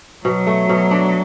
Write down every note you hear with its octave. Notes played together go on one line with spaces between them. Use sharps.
B2 F#3
A3
B2
D4